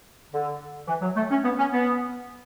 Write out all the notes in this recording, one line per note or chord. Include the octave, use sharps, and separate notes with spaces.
D3
E3
F#3
A3
C#4
B3
C#4
B3